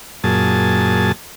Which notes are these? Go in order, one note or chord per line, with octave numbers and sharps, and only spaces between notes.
F#2 A#2 G#4 A5